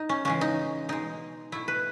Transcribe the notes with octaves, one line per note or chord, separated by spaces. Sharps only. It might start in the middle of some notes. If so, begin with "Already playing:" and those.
Already playing: D#4
C#4
C#3 E3 G#3 C#4
D#4
B2 G#3 D#4
B2 A3 E4
B4